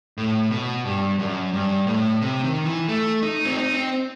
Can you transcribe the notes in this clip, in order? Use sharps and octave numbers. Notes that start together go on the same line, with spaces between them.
A2
B2
G2
F#2
G2
A2
C3
D#3
E3
A3
D#4
C4
D#4
C4